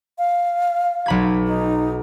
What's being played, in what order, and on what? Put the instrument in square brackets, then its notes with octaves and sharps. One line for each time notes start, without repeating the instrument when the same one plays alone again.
[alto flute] F5
[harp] B1 B5 G#6
[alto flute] D#4